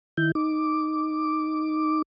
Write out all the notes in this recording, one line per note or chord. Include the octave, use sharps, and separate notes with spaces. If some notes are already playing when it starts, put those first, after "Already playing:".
D#3 E4 G6
D#4 D6